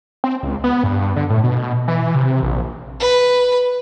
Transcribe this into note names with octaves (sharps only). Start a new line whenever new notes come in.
C4
C#2
B3
G2
D3
A2
B2
E3
C3
A#1
B4